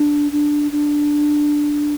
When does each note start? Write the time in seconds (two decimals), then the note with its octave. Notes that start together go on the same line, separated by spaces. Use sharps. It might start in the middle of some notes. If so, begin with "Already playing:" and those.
Already playing: D4
0.32 D4
0.72 D4